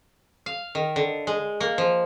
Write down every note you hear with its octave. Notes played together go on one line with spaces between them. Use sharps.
F5
D#3
D3
G#3
A#3
F3